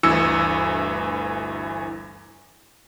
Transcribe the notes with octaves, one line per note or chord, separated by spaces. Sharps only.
G1 D2 E3 E6 C#7